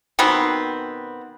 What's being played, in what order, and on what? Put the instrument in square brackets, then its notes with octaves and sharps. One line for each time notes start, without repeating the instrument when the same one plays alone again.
[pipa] B2 D#3 B3 C4